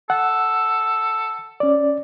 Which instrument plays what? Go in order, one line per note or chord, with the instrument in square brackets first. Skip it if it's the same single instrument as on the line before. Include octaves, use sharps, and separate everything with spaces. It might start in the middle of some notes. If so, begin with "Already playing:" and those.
[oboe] A4 [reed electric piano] F#5
[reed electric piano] C#4 D5